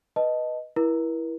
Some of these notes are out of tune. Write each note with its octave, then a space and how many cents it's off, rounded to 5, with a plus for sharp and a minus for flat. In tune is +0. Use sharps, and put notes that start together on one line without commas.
B4 -5 D#5 +0 A5 +0
E4 +0 A#4 +45